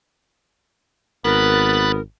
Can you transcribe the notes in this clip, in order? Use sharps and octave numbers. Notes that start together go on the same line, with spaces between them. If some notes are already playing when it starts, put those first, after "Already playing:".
G#1 B3 A#4 B5 F#6 A6